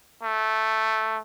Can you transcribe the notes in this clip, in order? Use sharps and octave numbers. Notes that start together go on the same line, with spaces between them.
A3